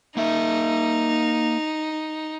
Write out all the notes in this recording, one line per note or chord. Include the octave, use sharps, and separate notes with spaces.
A#3 D#4 A#4 E5